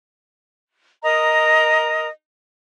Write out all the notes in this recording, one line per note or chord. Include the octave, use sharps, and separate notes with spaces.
A#4 D#5 A#5 D#6